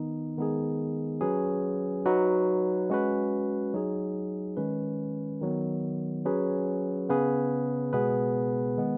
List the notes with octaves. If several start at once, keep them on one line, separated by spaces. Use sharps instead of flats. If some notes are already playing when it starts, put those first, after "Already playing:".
Already playing: D#3 B3 D#4
D#3 G#3 B3 D#4 G#4
F#3 C#4 G#4 B4
F#3 D#4 F#4 B4
G#3 C#4 F#4 B4
F#3 D#4 G#4
D#3 G#3 C#4 B4
D#3 F#3 B3
F#3 C#4 G#4 B4
C#3 B3 G#4 B4
B2 G#3 B3 G#4 B4
D#3 G#3 B3